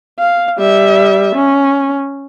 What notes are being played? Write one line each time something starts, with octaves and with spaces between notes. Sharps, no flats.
F5
G3 E5
C#4